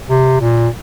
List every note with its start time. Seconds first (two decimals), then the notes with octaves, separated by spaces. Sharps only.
0.09 C3
0.40 A#2